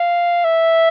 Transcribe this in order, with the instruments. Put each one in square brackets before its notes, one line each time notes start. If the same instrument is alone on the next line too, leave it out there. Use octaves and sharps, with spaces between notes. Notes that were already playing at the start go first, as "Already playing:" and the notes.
Already playing: [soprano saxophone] F5
E5